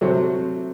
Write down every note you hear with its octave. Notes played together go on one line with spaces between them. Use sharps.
C3 F#3 A3 C4